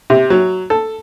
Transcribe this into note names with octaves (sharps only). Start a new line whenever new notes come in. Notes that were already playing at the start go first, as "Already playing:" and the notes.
C3
F#3
A4